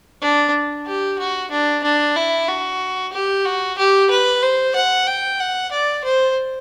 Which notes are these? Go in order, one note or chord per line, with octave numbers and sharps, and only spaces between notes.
D4
G4
F#4
D4
D4
E4
F#4
G4
F#4
G4
B4
C5
F#5
G5
F#5
D5
C5